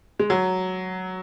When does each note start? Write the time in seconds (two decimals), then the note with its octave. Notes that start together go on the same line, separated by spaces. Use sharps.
0.19 G#3
0.30 F#3